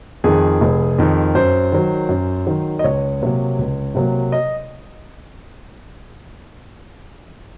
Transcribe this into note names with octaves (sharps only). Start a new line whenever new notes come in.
F2 D#3 G#4
F1
F2 D#3
F#2 C5
D#3 F#3
F#2
D#3 F#3
D#5
C#2 C#5
C3 F#3 A#3
C#2
C3 F#3 A#3
D#5